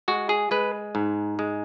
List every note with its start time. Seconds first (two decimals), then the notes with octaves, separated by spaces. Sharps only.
0.08 G#3 F#4
0.29 G#4
0.51 G#3 B4
0.95 G#2
1.39 G#3